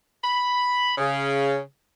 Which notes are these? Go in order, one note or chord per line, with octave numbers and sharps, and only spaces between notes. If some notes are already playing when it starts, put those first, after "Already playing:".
B5
C#3